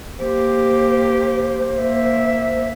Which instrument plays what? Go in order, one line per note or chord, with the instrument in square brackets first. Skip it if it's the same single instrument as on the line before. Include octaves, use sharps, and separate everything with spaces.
[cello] A#3 G4 [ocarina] C5
[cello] A#3 E5